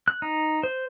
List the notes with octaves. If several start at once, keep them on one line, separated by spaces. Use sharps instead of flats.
F#6
D#4
C5